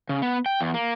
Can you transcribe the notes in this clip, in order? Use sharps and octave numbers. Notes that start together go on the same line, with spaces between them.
C#3
B3
G5
E2
A#3